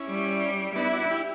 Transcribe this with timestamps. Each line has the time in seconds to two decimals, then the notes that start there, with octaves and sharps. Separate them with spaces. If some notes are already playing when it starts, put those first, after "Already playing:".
Already playing: C#4 E4
0.09 G3
0.76 B3 D4 E4
0.93 D4 F#4
1.10 E4 G4